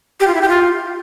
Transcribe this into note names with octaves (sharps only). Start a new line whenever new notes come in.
G4
F4
E4
G4
F4